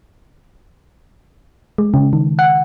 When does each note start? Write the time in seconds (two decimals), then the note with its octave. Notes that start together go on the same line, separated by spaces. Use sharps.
1.78 G#3
1.94 C#3
2.13 D#3
2.39 F#5